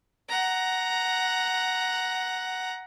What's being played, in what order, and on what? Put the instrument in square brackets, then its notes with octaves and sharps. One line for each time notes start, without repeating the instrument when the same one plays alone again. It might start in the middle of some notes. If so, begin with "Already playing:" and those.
[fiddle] F#5 A#5